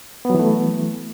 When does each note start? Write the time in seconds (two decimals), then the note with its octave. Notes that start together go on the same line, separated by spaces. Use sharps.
0.25 B3
0.30 F#3
0.35 E3
0.39 A3